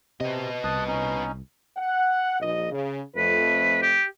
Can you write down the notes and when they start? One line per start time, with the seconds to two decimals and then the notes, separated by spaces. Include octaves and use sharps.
0.20 C3 B3 D#5
0.64 C2 A5 D#6 F#6
0.88 C#4 D#4
1.77 F#5
2.40 A#1 D#5
2.72 C#3
3.16 F2 A3 B4
3.82 G4